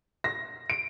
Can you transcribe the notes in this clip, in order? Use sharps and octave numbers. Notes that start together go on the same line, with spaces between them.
A#6
D7